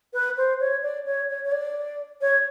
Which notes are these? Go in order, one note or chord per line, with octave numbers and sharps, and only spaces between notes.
B4
C5
C#5
D5
C#5
C#5
C#5
D5
C#5